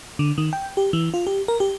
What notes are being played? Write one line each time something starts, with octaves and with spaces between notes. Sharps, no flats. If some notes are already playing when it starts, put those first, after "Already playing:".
D3
D#3
G5
G4
E3
F4
G4
A#4
G4